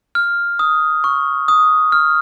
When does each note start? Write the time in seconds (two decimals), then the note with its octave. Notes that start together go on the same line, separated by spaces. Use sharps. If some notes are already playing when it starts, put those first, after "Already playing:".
0.15 F6
0.59 D#6
1.04 C#6
1.48 D#6
1.92 F6